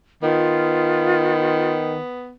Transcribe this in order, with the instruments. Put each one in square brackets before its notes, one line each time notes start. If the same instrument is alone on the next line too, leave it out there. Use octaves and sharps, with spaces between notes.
[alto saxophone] D#3 [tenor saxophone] B3 [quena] F4